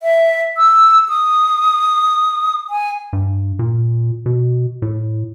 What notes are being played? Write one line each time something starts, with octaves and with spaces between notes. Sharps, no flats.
E5
E6
D#6
G#5
G2
A#2
B2
A2